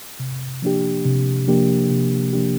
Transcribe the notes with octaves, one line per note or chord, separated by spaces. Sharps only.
C3
F3 A#3 D4 G4
C3
F3 A#3 D4 G4
C3
F3 A#3 D4 G4